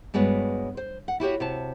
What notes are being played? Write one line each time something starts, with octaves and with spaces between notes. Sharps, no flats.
G2 G#3 B3 F#4 C#5
C5
F#5
E4 F#4 G4 C#5
C3 F#4 A5